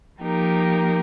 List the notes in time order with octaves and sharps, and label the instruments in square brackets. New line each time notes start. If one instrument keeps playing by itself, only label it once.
[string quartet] F3 A#3 D#4 G4 A#4